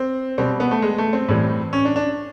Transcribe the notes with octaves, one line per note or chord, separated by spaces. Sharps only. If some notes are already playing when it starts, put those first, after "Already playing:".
Already playing: C4
B2 G3 C4
B3
A3
G#3
A3
C4
A2 E3 G3
C#4
D4
D4